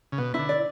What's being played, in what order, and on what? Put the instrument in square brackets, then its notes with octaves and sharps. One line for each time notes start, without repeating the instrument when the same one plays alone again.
[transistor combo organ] C#3
[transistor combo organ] B2 [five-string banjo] B3
[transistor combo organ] D3 [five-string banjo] E4
[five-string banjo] D5